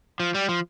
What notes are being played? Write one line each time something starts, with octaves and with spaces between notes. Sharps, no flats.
F3
G3
F3